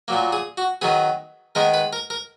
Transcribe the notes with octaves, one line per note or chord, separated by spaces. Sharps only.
A#2 F#3 A#3
G#4
F#4
D#3 F#3 B3 G#4
D#3 G#3 B3 A#4
B4
A#4
A#4